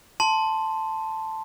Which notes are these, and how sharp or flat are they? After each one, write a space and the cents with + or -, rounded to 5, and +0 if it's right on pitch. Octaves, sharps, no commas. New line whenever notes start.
A5 +0 C6 +0